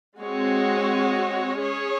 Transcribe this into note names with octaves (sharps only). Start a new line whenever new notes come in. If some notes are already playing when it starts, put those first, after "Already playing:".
G#3 C4 F#4 C#5
C#4 G#4 C#5